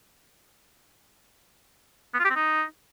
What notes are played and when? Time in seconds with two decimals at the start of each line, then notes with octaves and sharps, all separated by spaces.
2.14 B3
2.19 F4
2.25 G4
2.30 C4
2.35 D#4